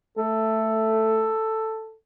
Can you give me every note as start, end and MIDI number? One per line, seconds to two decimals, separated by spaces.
0.18 1.32 57
0.18 1.94 69